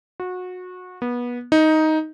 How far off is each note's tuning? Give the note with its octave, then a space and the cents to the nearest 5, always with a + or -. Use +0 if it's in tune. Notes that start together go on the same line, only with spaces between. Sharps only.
F#4 -25
B3 -25
D#4 +10